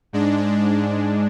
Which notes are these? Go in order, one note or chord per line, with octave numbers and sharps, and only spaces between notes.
G#2 G#3 D4